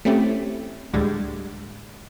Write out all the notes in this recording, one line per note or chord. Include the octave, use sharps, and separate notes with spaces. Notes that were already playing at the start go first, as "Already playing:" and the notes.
A3 C4 C#4 E4 G4
D2 A2 D3 G3 G#3